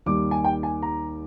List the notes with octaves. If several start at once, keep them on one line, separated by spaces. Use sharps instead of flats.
D#2 D#3 G3 D6
G#5
G5
G#5
A#5